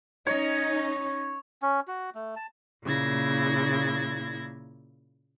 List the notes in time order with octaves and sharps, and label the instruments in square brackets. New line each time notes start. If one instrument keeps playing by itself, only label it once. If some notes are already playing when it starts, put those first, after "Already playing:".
[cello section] C#4 D#4 [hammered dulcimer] C#5
[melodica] C#4
F#4
A3
A5
[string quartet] A#2 C#3 A#3 E4 G#6 A#6